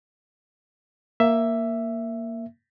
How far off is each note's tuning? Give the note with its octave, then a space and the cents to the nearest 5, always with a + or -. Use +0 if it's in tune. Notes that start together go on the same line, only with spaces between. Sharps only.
A#3 +0 E5 +10